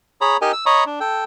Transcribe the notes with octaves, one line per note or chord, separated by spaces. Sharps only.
G#4 C#5 A#5 B5
D#4 G4 A#4 D#5 G#5
E6
C#5 D#5 A#5 B5 C#6 D#6
D4
A4 G5